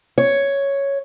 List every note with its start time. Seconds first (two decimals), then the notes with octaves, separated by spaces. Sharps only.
0.18 C#5